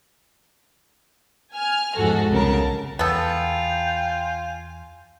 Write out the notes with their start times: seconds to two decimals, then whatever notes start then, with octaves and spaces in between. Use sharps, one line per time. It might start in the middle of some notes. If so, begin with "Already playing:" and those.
1.53 G#5 F6
1.95 E2 G#2 F3 F#4 A4
2.29 C2 C#3 A#4 A5
2.99 E2 B3 F4 A4 G5 G#5